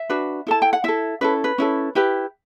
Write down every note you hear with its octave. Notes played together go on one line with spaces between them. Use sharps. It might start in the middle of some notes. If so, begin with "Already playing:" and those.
Already playing: E5
D4 F#4 B4
E4 A4 A5
G5
F#5
E4 A4 E5
C#4 E4 A4 B4
B4
C#4 E4 A4
E4 G4 B4